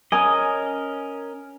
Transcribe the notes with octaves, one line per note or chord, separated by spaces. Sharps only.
C#4 A#4 D#5 G#5 D#6